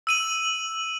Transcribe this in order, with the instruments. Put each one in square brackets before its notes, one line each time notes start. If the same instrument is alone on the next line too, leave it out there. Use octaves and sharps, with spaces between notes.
[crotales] E6 D#7 F#7